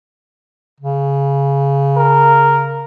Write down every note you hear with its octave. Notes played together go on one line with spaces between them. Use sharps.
C#3
A#4